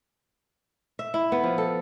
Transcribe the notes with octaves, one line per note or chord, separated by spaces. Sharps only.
E5
E4
B3
F3
A4